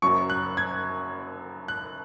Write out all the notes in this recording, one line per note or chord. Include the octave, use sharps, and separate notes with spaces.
F#1 F#2 F#3 C#6
F#6
G#6
F#6